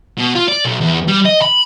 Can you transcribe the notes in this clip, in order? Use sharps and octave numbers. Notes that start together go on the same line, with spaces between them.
B2
F4
D5
B1
E2
G3
D#5
B5